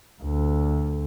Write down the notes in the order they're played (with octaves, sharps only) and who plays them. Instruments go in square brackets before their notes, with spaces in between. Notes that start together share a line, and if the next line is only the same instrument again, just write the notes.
[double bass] D2